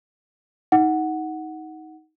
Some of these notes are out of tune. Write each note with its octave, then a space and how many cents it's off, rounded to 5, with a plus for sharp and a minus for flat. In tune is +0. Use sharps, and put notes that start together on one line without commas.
D#4 +20 F#5 +0